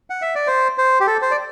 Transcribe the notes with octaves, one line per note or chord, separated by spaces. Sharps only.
F#5
E5
D5
C5
C5
G4
A4
C5
D5